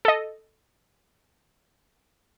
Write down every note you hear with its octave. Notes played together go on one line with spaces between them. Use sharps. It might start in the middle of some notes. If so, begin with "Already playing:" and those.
A4 D#5